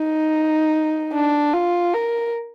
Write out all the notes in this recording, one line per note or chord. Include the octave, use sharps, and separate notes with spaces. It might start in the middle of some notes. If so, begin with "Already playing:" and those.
Already playing: D#4
D4
F4
A#4